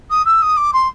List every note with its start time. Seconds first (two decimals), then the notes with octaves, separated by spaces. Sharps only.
0.10 D#6
0.25 E6
0.42 D#6
0.57 D6
0.73 C6